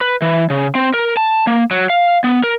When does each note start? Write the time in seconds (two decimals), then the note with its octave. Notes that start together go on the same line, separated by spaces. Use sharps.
0.01 B4
0.22 E3
0.50 C#3
0.75 C4
0.94 A#4
1.17 A5
1.47 A#3
1.71 F#3
1.90 F5
2.24 B3
2.44 A#4